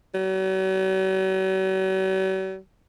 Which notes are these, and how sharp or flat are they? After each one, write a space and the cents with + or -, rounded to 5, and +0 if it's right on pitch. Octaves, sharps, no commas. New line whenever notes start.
F#3 +45